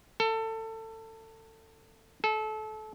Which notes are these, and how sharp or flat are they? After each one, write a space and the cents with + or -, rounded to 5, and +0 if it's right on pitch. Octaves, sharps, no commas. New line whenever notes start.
A4 +25
A4 -25